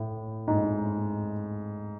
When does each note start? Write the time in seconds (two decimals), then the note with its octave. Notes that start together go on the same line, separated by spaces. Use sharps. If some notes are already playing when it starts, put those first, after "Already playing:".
Already playing: A2
0.48 G#2